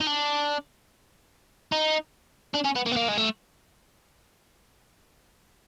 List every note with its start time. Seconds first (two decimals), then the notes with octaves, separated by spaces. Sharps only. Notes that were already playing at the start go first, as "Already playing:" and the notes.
0.01 D#4
0.07 D4
1.72 D#4
2.55 D4
2.65 C#4
2.76 B3
2.86 A#3
2.92 B3
2.96 A#3
3.08 G#3
3.18 A3